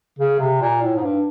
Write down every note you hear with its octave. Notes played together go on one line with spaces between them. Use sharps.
C#3
C3
A#2
A2
G#2
G2